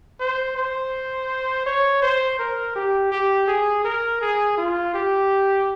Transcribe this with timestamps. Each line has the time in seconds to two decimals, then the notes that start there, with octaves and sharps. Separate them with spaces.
0.20 C5
0.56 C5
1.66 C#5
2.02 C5
2.39 A#4
2.75 G4
3.12 G4
3.48 G#4
3.84 A#4
4.21 G#4
4.57 F4
4.94 G4